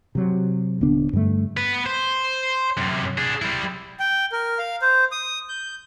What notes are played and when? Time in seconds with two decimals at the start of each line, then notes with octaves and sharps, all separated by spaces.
0.15 C3 F#3
0.81 D#1 D3 B3 D4
1.13 G2 D3 G3 A3
1.57 B3 B4
1.86 C5
2.77 F#2 C3
3.18 D4 G#4
3.42 G3 E4
4.00 G5
4.32 A#4
4.59 F5
4.82 C5
5.12 D#6
5.49 G6